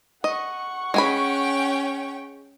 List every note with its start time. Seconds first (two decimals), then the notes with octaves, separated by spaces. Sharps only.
0.24 D#5 F#5 C#6
0.94 G#3 C#4 G5 G#5 B5